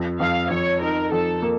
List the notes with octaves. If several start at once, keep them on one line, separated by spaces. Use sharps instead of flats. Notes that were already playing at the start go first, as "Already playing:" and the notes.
Already playing: F2
F2 F5
F2 C#5
D#4 A#4
F2 A4
A#3